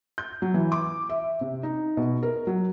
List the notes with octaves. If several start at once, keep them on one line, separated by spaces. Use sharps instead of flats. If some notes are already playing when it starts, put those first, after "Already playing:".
G6
F#3
E3
D6
E5
C3
D#4
B2
A#4
F#3